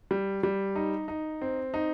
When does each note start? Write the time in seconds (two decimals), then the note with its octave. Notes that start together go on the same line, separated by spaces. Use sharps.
0.11 G3
0.43 G3
0.76 D#4
1.08 D#4
1.42 C4
1.74 D#4